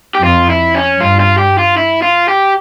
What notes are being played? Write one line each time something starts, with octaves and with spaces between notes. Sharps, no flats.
G4
F2 F4
E4
C#4
G2 F4
F4
G4
F4
E4
F4
G4